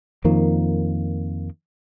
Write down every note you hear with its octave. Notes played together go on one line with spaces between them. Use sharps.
F2 D#3 F3 A#3